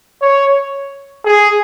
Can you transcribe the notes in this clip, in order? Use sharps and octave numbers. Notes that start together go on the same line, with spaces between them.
C#5
G#4